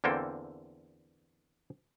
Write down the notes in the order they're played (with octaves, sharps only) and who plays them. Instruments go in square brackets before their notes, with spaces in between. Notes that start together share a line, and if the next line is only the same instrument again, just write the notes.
[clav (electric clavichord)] E2 D3 A#3 C4 A4 G5